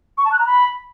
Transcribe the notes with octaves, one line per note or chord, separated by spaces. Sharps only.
C#6
A5
F#6
A#5
B5